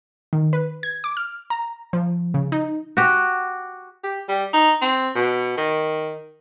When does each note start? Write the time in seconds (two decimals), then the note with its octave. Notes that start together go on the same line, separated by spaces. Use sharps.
0.33 D#3
0.53 B4
0.83 G#6
1.04 D6
1.17 F6
1.50 A#5
1.93 F3
2.34 C#3
2.52 D#4
2.97 F#4 G4
4.04 G4
4.29 G3
4.53 D#4
4.82 C4
5.16 B2
5.57 D#3